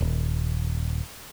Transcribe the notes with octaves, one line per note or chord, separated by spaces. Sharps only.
D#1